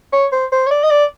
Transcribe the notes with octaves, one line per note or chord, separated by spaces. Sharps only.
C#5
C5
C5
C#5
D5
D#5
D5